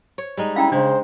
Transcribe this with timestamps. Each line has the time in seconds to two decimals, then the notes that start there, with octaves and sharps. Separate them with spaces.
0.18 C#5
0.37 G3 G#3 D#4
0.56 C#4 E4 F5 G5 A#5
0.72 C#3 G#3 D4 C5